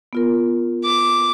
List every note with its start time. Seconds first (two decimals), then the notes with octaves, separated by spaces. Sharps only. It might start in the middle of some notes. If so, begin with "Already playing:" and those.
0.13 B3 F4 A#4
0.84 D6